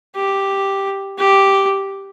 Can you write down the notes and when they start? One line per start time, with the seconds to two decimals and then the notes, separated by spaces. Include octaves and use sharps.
0.15 G4
1.18 G4